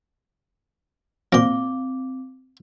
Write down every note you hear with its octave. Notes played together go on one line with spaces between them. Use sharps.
A#2 F3 C4 D6